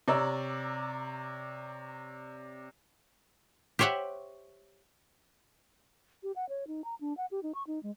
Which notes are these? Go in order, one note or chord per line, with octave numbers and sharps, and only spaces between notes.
C3 C#5 D5 A#5 E6
G4 C5 C#5 E5 F#5
G4
F#5
C#5
D#4
A#5
D4
F#5
G4
D#4
C#6
D#4
G#3